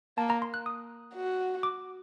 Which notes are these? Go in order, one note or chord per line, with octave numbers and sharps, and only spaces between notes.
A#3 A5
A#5
C6
F#6
D#6
F#4
D6